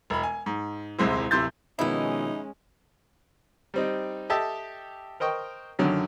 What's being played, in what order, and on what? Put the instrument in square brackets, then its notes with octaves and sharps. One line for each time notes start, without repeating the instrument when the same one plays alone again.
[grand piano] E1 B5
G#5
G#2
D#1 C2 G#3 C4 E4
D1 C3 E4 C6 G6 A6
[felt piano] B2 D#3 F3 [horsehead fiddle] G#3 C#4 [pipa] B3 E4 [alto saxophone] D#4
[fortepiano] G3 C4 D#4
G4 A4 D#5 E5 A5
A#4 C5 D#5 G5 C#6
F#2 D3 D#3 F#3